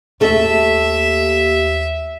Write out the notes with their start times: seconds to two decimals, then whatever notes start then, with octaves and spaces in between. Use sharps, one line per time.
0.21 D#2 A3 A4 E5